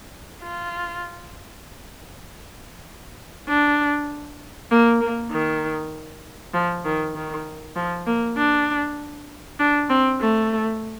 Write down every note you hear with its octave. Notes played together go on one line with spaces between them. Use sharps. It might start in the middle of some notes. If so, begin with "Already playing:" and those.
F4
D4
A#3
A#3
D#3
F3
D#3
D#3
F3
A#3
D4
D4
C4
A3